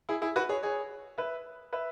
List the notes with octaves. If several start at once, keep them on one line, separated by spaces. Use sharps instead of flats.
E4 G#4
E4 G#4
F#4 B4
G#4 C#5
G#4 C#5
B4 E5
B4 E5